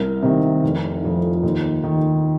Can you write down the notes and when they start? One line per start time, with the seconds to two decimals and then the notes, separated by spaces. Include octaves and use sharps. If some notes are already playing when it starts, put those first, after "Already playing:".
Already playing: C2 A#4
0.23 C3 D#3
0.63 F1
1.03 F2 F3
1.43 D#2
1.84 D#3